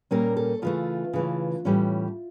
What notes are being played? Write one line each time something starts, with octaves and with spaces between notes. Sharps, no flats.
A#2 G3 A#3 C#4 A#4
A4
C#3 E3 A3 F4
C#3 E3 A3
A2 E3 G3 C#4